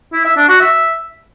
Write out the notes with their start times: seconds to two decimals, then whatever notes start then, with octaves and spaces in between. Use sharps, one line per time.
0.13 E4
0.25 E5
0.37 D4
0.49 F#4
0.60 E5